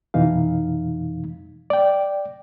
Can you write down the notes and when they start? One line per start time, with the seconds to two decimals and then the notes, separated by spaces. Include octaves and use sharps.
0.14 F2 B2 E3 D#4 F5
1.70 D5 G5